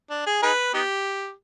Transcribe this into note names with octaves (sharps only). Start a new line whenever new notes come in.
D4
G#4
D#4 G#4 B4
B3 D#4 G4